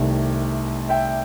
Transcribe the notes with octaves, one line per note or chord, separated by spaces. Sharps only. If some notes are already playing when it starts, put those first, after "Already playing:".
Already playing: C2 C3 D#3 A3
E5 G5